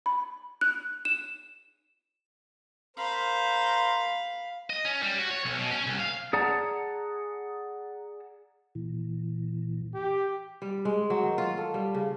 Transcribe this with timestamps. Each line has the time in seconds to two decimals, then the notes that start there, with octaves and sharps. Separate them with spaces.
0.06 B5
0.61 F#6
1.05 E7
2.97 A#4 C5 F5 B5
4.70 D#5
4.85 C#4
5.03 G3
5.18 F#4
5.31 C#5
5.45 B1
5.58 B2
5.71 C#4
5.87 C2
5.99 F5
6.33 G#4 D5 F#5 A5 A#5
8.75 A#2 E3
9.95 G4
10.62 G3
10.85 G#3
11.10 F#3
11.23 D#3
11.38 F4
11.58 A4
11.74 G3
11.94 C#3